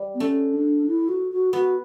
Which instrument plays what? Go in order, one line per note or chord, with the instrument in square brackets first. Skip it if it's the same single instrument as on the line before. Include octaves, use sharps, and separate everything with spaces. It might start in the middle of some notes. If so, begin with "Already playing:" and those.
Already playing: [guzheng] G3
[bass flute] B3
[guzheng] A3 [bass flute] C#4
[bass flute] D4
E4
F#4
F#4
[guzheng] B3 [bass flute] F#4